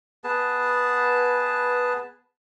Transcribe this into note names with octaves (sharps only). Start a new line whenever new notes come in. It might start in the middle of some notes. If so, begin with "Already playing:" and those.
B3 G#4 B4 A5